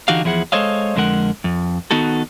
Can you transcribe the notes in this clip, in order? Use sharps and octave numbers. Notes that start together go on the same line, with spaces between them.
D3 E3 D#4 F#4 G4 F5
E2 F3 E4 G#4 F#5
G#3 A4 C5 C#5 D#5 F5
F2 D3 G#3 A#4 F#5
F2
D#3 B3 D#4 F#4 A4